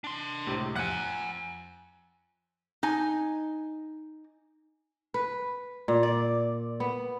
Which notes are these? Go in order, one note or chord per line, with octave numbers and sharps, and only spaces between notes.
D4 C6
C#2 A2 C3
F2 F#5 G#5 F#6 C#7
D#4 G#5
B4
A#2
D5
B3